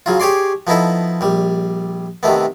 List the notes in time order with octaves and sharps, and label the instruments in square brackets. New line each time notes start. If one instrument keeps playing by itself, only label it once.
[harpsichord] C#3 F#3 F4
G4 G#4 C#5 D5 C6
F3 B3 D#4 E4 A4
A#1 G3
C3 D#3 A3 B3